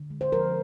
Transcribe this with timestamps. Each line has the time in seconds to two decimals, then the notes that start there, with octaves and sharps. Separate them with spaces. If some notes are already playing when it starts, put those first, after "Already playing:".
Already playing: D3
0.10 G#3
0.21 C5
0.32 F3 A#4